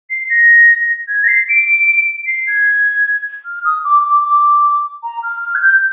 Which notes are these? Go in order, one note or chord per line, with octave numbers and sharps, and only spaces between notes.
C7
A#6
G#6
A#6
C7
D7
C7
G#6
F6
D#6
D6
D6
D6
A#5
F6
F6
G#6
G6